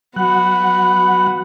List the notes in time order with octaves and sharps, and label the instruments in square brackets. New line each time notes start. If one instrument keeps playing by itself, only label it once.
[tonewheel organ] F#3 F#5 F#6 [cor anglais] B3 [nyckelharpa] F#4